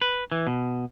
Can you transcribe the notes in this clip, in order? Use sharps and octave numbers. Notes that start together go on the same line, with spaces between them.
B4
E3
B2